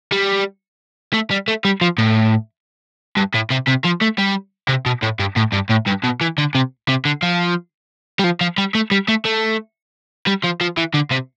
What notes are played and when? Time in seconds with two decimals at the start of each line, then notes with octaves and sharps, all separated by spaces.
0.12 G3
1.14 A3
1.31 G3
1.48 A3
1.65 G3
1.81 F3
1.98 A2
3.17 G2
3.34 A2
3.50 C3
3.67 C3
3.84 F3
4.01 A3
4.18 G3
4.68 C3
4.86 B2
5.02 A2
5.20 G2
5.37 A2
5.53 G2
5.70 A2
5.87 G2
6.04 B2
6.21 E3
6.38 D3
6.55 C3
6.88 C3
7.05 D3
7.23 F3
8.19 G3
8.24 F3
8.41 F3
8.58 G3
8.75 A3
8.91 G3
9.08 A3
9.25 A3
10.27 G3
10.44 F3
10.61 F3
10.78 E3
10.94 D3
11.11 C3